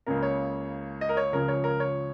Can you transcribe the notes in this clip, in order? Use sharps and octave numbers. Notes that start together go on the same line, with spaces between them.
C#2 C#3 A#3 A#4
C#5
D#5
A#4
C#5
C#2 C#3 F3 A#4
C#5
A#4
C#5